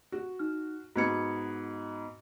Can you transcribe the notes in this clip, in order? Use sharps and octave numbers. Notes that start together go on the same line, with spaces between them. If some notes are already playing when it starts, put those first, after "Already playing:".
F#4
D#4 F6
G#2 B3 F#4 G#6 C#7